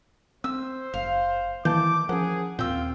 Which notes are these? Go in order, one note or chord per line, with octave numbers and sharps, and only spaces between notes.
C4 C5 E6
F#1 F5
D#3 E3 A#3 A5 D6 G6
F3 C#4 G#4 A#4 F#5
D#2 A#2 C4 F4 G5 E6